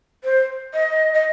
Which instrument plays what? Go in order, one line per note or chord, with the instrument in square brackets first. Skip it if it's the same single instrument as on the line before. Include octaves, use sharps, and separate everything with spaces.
[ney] C5
D#5
D#5